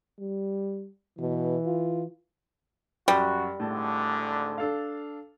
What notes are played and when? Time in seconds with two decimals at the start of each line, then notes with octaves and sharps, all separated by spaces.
0.20 G3
1.19 B2 E3
1.66 F4
3.08 F#2 G3 F#4
3.60 G#1 A2 D3 A5
4.58 D4 A4 F5